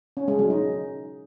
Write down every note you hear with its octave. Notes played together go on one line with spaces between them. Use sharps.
C#4
G#3
F#3
D#4